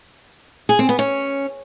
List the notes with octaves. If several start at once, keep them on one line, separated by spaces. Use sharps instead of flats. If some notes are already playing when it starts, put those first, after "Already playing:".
G#4
C4
B3
C#4